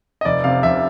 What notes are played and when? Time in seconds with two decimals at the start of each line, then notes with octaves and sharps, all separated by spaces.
0.21 D#5
0.25 F1 D5
0.44 C3 F5
0.63 F1 E5